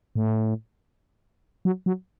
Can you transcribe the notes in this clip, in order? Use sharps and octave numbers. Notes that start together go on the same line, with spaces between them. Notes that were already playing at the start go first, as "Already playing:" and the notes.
A2
F#3
F#3